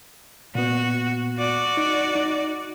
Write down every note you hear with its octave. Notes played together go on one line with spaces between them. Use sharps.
A#2 B3 F#4
F#4 D5
D#4
D#4